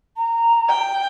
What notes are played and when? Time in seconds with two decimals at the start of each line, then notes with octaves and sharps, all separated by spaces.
0.17 A#5
0.69 G5